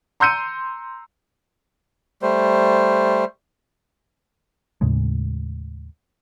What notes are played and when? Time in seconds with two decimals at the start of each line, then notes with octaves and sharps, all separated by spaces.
0.20 A#5 C6 E6 G6 C#7 D#7
2.22 G3 A3 C5
4.81 D#2 A2 C#3 G#3